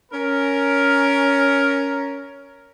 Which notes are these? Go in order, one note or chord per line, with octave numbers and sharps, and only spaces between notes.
C#4 A#4